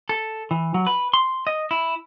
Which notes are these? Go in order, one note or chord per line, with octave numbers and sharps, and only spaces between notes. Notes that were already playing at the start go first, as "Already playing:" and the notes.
A4
E3
F#3
B4
C6
D#5
E4